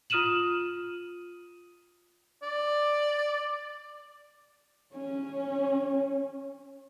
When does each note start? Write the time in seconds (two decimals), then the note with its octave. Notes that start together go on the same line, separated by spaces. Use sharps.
0.10 F4 D#6 F6 D#7 E7 F#7
2.43 D5
4.94 C#4 C#5